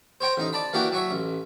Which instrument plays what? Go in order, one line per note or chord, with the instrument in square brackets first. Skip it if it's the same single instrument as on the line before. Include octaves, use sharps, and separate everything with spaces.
[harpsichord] C5 C#5 G5 A#5
A1 D#4
D5 A5 B5
E3 A#3 D4 F#4 G4
F#3 C#5 E5
A1